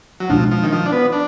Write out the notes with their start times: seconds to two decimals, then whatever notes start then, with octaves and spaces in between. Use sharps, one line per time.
0.20 F#3
0.30 B2 F3 G#3 D4
0.51 F3
0.63 D#3
0.72 F3
0.86 D4
0.92 B3
1.12 D4